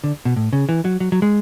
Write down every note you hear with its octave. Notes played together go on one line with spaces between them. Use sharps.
D3
B2
A2
C#3
E3
F#3
F#3
F#3
G#3